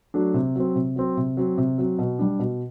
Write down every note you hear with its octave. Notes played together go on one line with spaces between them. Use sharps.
F#3 A3 D4
C3
F#3 C4
C3
F#3 C4
C3
F#3 C4
C3
F#3 C4
B2
G3 D4
B2